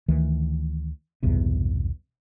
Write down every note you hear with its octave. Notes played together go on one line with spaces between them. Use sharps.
D2 D#3 E3
B1 E2 G2 C3